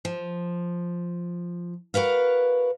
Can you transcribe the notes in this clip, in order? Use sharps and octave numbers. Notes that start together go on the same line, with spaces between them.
F3
F#4 A#4 B4 F5